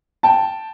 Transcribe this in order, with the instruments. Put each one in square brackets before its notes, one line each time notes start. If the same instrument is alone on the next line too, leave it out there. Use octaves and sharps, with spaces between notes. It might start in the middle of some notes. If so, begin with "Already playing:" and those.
[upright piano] G5 A5